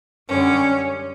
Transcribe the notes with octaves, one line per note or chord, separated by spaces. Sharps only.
F#2 D3 G3 C#4